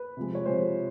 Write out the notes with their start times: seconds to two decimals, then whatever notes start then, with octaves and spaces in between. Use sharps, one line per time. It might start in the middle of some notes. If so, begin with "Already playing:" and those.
Already playing: B4
0.17 C3 F3 G#3
0.35 C#5
0.46 C3 F3 G#3 C5